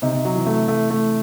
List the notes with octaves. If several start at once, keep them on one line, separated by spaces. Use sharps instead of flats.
C3 D#4
C3
F#3
E3
A3
A3
A3